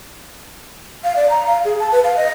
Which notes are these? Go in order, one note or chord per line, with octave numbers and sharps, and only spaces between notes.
F5
D5
A#5
F5
G#4
A5
B4
F5
D#5